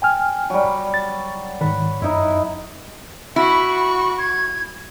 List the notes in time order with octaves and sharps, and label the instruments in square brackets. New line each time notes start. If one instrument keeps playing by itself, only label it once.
[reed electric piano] G5 G#5 F6
[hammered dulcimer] F#3 G3
[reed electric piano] A6
[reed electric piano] G#2 D#3 [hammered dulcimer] F#5 B5
[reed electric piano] F#2 [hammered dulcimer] D#4 E4
[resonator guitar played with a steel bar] E4 [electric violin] F#4 C#6 [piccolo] B5
[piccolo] B5
G#6